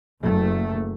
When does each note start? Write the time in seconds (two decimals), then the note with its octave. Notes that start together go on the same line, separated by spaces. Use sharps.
0.23 F#1 A3